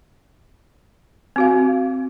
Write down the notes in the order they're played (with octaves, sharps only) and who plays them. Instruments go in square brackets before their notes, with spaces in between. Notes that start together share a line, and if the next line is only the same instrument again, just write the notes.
[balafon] C4 F#4 F5